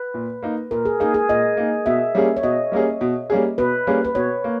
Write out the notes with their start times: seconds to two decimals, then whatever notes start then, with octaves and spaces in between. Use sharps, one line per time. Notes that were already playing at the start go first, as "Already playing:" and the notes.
Already playing: B4
0.14 A#2
0.43 A#3 D#4
0.71 A#2 A#4
0.85 G#4
1.00 A#3 D#4 G#4
1.14 G#4
1.29 A#2 D#5
1.57 A#3 D#4
1.86 B2 E5
2.15 G3 A#3 C#4 G#4
2.37 C#5
2.43 B2 D#5
2.72 G3 A#3 C#4 G#4
3.01 B2
3.30 G3 A#3 C#4 G#4
3.58 B2 B4
3.87 G3 A#3 C#4 G#4
4.05 B4
4.15 B2 C#5
4.44 A#3